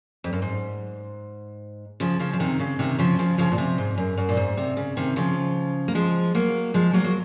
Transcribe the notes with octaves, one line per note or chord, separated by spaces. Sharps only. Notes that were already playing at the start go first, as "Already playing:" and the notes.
F2
F#2
G#2
C#3 F3
C#3 F3
F3
C3 D#3
C#3
C3 D#3
C#3 F3
C#3 F3
C#3 F3
A#2
C3
G#2
F#2
F#2
A#2
G#2
C3
C#3
C3 D#3
C#3 F3
A#3
F3 G#3
F#3 A#3
F3 G#3
F#3 A#3
F#3